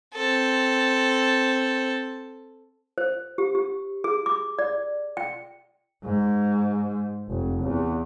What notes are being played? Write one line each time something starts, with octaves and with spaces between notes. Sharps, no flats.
C4 A4
C5
G4
G4
G#4
D6
D5
G5
G#2
F1
E2